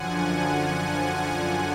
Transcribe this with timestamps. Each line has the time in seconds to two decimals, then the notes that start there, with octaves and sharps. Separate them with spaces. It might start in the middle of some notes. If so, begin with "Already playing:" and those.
Already playing: F#2 D3 F3 F#5 G#5